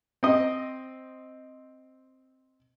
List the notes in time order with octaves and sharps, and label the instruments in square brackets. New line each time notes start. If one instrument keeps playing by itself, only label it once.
[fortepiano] C4 D#5